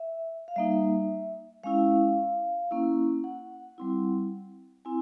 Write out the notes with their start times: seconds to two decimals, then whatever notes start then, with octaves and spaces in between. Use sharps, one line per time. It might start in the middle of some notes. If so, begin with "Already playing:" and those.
Already playing: E5
0.48 F5
0.56 G3 A#3 D#4 E5
1.63 G#3 C#4 E4 F5
2.71 A#3 C#4 E4
3.24 F#5
3.78 G3 C4 E4
4.85 C4 E4 G#5